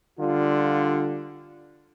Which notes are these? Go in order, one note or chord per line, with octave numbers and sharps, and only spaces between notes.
D3 G3 F4